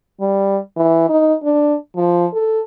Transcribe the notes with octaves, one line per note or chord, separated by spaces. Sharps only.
G3
E3
D#4
D4
F3
A4